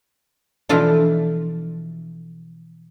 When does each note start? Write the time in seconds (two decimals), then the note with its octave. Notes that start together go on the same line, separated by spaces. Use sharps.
0.69 B2 E3 F3 D4 F4 A4